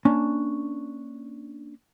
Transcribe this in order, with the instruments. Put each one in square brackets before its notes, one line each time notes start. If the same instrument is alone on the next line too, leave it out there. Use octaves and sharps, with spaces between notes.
[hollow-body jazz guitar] A#3 C#4 D4